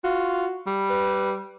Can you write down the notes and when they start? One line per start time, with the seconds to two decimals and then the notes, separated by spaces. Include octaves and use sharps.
0.04 F4 F#4
0.67 G3
0.90 B4